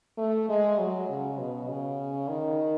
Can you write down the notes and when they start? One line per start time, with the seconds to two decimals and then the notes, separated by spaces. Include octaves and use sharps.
0.18 A3
0.49 G#3
0.78 F#3
1.09 C#3
1.38 B2
1.68 C#3
2.28 D#3